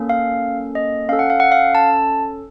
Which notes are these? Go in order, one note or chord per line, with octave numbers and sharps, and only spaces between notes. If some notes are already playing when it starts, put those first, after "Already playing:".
Already playing: A#3 C#4 A4
F5
D#5
C#4 A4 F5
F#5
F5
F#5
F5
A5